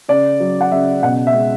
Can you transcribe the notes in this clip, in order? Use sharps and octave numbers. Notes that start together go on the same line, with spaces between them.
C#3 D5
F#3
F#5
C#3 E5
B2 F#5
E5
G#3